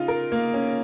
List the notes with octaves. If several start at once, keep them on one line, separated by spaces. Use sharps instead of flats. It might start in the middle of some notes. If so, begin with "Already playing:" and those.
Already playing: C#3 D#4 F4
A#4
A#3
C#4